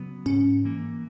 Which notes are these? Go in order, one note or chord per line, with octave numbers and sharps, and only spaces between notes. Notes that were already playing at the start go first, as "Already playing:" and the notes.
Already playing: C#3 F#3 B3
G#2 C#4
E3 A#3